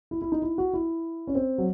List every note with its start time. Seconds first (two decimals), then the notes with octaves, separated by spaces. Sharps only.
0.11 E4
0.22 E4
0.32 D#4
0.42 E4
0.58 F#4
0.73 E4
1.27 C#4
1.35 C4
1.58 F#3